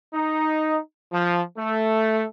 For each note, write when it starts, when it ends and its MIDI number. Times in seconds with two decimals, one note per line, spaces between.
0.14 0.79 63
1.13 1.41 53
1.58 2.24 57